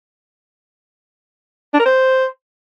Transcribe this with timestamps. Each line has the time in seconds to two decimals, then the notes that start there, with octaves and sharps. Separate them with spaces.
1.74 D4
1.80 A#4
1.86 C5